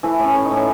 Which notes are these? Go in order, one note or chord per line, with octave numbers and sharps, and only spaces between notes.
E3 A3 E4
A2
C#4
E3 C#4
D#4
A2
C#4